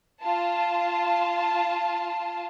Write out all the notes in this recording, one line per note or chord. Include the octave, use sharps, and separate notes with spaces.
F4 A5